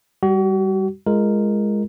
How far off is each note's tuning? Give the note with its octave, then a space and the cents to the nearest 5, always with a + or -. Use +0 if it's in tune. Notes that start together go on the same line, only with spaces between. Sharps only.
G3 +0 F#4 +40
G#3 +0 F4 -20 A#4 -5